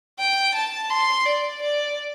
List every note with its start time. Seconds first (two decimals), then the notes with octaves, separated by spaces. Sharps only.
0.19 G5
0.55 A5
0.90 C6
1.25 D5
1.61 D5